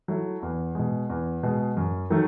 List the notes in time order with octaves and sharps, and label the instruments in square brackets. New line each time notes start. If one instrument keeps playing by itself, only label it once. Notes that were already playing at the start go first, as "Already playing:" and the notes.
[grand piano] F#3 A3 E4
E2
B2 G#3
E2
B2 G#3
F#2
D#3 F#3 A3